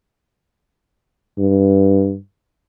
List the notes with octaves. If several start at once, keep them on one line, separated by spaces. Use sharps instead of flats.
G2